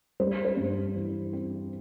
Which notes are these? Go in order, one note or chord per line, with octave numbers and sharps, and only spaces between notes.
G3 C5
C5
G2
E3
C4